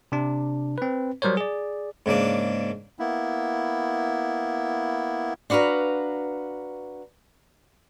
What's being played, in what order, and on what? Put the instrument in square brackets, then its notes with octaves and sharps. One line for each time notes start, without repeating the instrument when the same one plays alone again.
[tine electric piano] C3 D4
C4 B4
F#3 G3 A#4 C5 C#5
G#4 D5
[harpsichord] G#2 C#3 A#3 D4
[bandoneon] A#3 B3 E4
[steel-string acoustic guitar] D4 F#4 B4 F5 A#5